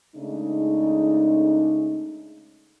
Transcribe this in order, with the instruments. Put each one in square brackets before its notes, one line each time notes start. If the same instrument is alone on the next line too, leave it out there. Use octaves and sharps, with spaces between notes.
[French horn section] C#3 G#3 A3 D4 D#4